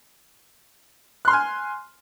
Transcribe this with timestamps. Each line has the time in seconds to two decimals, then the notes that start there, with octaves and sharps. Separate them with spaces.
1.25 F#6
1.28 C6
1.30 F6
1.33 G#5